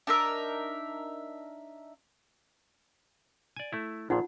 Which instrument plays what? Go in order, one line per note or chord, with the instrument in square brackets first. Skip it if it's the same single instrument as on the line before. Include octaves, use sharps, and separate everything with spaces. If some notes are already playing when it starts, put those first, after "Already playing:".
[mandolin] D4 D#4 A#4 E5
[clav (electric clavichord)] D5 G#5
A3 E4
[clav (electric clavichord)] A#1 A#2 [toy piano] D#4 F4 F#5